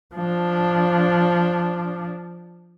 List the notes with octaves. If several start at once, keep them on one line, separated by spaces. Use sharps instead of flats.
F3 D4